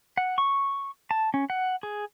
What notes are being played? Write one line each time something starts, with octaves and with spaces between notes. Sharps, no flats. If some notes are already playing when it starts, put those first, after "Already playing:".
F#5
C#6
A5
C#4
F#5
G#4